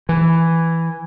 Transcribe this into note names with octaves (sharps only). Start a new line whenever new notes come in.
E3